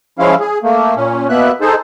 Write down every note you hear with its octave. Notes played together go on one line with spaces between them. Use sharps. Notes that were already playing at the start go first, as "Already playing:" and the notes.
F3 G#3 C#4 E4 F5
G#4
A3 A#3
A#2 C#4
B2 A#3 B3 E5 F#6
D#4 G#4 A4 C5